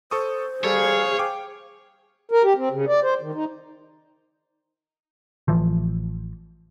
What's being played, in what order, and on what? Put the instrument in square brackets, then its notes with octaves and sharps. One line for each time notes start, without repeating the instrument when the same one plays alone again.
[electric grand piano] A4 C#6 D#6 [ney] C5
[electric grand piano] G3 A4 [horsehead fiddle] G#4 F5 [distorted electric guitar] C#5
[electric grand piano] G5 D6
[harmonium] A#4
G4
C4
C#3
D5
C5
D#3
D#4
[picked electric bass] A1 E3 F3